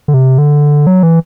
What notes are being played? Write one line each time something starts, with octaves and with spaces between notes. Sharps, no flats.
D3
C3
D3
F#3
E3